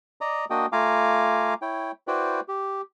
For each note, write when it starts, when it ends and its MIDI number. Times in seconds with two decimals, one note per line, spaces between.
0.21 0.45 74
0.21 0.45 75
0.21 0.45 82
0.21 0.45 87
0.50 0.66 58
0.50 0.66 62
0.50 0.66 66
0.50 0.66 75
0.50 0.66 79
0.50 0.66 87
0.72 1.54 57
0.72 1.54 65
0.72 1.54 77
0.72 1.54 80
0.72 1.54 82
0.72 1.54 86
1.62 1.91 64
1.62 1.91 73
1.62 1.91 79
2.07 2.40 64
2.07 2.40 66
2.07 2.40 71
2.07 2.40 72
2.07 2.40 74
2.07 2.40 79
2.48 2.82 67